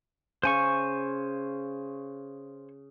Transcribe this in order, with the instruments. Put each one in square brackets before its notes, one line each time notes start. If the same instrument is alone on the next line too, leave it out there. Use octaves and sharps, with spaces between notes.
[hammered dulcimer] C#3 [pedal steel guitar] C5 G#5 C#6